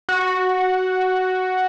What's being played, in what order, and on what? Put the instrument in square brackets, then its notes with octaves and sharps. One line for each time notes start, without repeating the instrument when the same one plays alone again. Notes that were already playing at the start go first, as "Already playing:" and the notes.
[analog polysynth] F#4